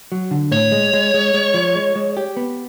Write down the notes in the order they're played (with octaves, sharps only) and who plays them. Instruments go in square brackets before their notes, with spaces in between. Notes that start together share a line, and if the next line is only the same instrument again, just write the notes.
[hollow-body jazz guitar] F#3
D3
[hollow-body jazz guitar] A2 [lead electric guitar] C#5
[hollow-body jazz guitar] G#3
G#3
G#3
G#3
F3
G#3
G#3
G4
B3